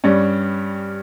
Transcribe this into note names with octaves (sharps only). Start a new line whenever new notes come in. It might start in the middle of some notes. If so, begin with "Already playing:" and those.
G2 G3 C#4